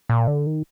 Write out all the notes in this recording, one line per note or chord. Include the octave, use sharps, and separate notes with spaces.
A#2
D3
D#3